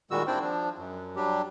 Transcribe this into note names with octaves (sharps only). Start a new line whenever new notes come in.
A#2 D#3 G3 G#3 F#4 E6
C4 D4 E4 C5 D5 G5
F3 D4
F#2
F#3 G3 D4 G4